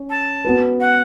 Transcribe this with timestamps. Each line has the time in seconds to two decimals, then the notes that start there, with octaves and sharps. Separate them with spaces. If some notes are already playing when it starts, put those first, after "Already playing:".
Already playing: C#4
0.10 A5
0.45 B3 F#4 B4
0.80 F#5